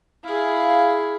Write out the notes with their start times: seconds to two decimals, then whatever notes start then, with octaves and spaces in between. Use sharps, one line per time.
0.23 E4 G#4 F5